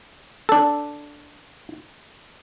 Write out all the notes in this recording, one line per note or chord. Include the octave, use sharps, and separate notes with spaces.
D4 A4